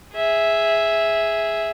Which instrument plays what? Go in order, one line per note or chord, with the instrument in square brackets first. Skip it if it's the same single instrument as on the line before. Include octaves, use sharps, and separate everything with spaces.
[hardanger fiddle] G#4 E5